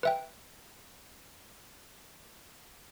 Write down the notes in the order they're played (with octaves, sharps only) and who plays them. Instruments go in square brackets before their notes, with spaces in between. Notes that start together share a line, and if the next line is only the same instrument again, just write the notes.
[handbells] B4 E5 G5